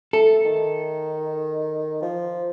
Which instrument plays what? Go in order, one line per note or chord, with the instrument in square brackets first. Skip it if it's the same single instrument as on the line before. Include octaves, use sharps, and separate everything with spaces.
[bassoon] A3 [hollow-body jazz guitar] A4
[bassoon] D#3
F3